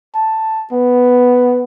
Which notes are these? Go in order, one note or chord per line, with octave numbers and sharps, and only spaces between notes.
A5
B3